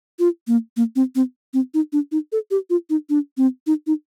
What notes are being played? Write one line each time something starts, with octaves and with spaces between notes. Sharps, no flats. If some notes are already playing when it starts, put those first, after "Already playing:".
F4
A#3
A#3
C4
C4
C4
D#4
D4
D#4
A4
G4
F4
D#4
D4
C4
D#4
D#4